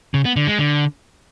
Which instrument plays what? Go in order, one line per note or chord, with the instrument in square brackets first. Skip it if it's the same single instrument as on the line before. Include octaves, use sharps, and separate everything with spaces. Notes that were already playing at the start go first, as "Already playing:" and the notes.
[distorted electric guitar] C#3
B3
D3
G#3
D3